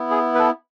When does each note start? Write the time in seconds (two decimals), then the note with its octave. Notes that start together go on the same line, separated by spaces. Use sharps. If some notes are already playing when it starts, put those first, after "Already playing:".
Already playing: B3 E4
0.11 G#4
0.35 B4
0.39 A4